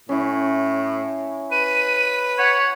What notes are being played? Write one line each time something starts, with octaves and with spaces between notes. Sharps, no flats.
A2 C#4 E4
B4 D#7
C#5 F#5